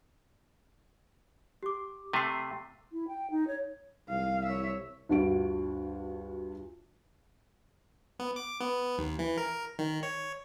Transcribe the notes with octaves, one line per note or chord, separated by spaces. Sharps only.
G4 D6
C3 A3 C7 D#7
E4
G5
D#4
C#5
C2 F5
C#5 E5
D2 G2 F4 F#4 D7
B3
D6
B3
D#2
E3
A#4
D#3
C#5